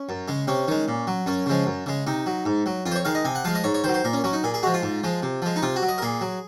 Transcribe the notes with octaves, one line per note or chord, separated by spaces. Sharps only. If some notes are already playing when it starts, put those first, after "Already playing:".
Already playing: C#4
F#2
C#3 G#3
C3 C#4
D#3 G#3
A#2
F#3
F#2 C#4
C#3 F3 G#3
F#2
C#3 G#3
C3 D#4
F#3
G#2
F#3
F2 F4
C5
C#5
D#3 G#3 F5
D#5
C3 G#5
F#5
F3 G#3 F5
D#5
G#2 C#5
C#5
D#3 F#3 C5
C5
A#2 A#4
C#4
F#3 C#4
D#4
A#2 G#4
G#4
F3 G#3 F#4
F4
G#2
F3 G#3
C3
F3 G#3
D#4
C3 F4
F#4
F#3
D#5
A#4
A#2 G#4
F#3